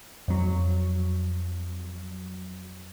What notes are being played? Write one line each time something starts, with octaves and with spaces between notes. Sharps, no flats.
F2 F#3